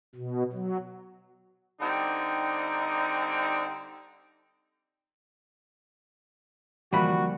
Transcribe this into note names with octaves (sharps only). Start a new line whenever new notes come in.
B2
F#3
D3 G3 C4 D#4
D3 E3 F3 G3 A#3 F#4 B5